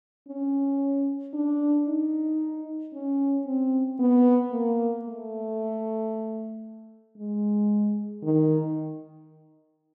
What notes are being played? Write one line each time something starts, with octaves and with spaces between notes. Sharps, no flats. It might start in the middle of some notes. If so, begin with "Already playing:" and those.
C#4
D4
D#4
C#4
C4
B3
A#3
A3
G#3
D#3